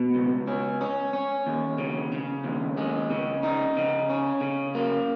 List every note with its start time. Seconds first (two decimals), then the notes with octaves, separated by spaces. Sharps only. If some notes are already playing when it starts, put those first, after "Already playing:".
Already playing: B2
0.15 C#2
0.48 C#4
0.81 C#4
1.13 C#4
1.47 D#2
1.78 C#3
2.12 C#3
2.44 D#2
2.77 G#3
3.10 C#3
3.43 D#4
3.77 C#3
4.10 C#4
4.41 C#3
4.75 A#3